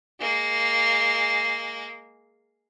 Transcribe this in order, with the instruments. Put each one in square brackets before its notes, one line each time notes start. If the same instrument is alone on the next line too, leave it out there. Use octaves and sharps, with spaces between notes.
[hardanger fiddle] G#3 A#3